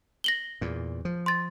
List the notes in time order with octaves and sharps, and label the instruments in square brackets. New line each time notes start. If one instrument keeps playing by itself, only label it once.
[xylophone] A#6 F#7 G7
[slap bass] E2 A#2
F3
[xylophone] C6 A6